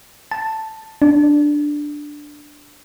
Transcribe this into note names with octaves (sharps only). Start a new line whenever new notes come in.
A5
D4